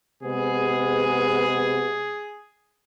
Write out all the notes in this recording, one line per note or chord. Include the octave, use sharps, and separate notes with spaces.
C3 G#3 B3 G#4